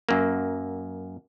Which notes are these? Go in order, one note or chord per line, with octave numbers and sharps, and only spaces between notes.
F#2 A#3